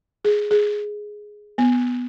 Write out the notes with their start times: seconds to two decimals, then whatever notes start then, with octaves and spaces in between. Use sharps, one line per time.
0.25 G#4
0.51 G#4
1.58 B3